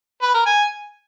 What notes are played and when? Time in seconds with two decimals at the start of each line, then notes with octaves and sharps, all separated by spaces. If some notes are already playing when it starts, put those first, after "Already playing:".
0.22 B4
0.34 A#4
0.46 G#5